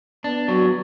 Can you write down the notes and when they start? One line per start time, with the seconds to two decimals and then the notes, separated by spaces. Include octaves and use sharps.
0.24 B3 D4
0.48 F#3